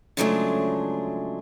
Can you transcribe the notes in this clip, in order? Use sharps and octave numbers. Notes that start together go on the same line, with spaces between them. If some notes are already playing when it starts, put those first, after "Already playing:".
C#3 F3 F#3 G#3 A3 D4